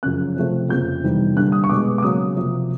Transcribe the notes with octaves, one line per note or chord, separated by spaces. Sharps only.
F#2 C#3 F3 F#6
C3 F3 A3 C4
F2 C#3 F3 A#3 G6
E2 C3 D#3 G3
G2 D3 G3 A#3 F#6
D#6
C#6
B2 G#3 B3 D6
D6
C#3 F#3 A#3 D#6
C3 F3 A#3